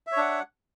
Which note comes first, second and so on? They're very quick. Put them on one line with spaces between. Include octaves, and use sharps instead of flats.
E5 C#5 D4 F#5